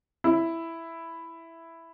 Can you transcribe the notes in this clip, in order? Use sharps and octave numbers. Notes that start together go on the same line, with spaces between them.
E4